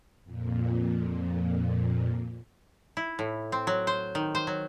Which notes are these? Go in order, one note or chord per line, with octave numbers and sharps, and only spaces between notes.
F2 A#2
E4
A2
C4
F#3
C5
D#3
C5
F#3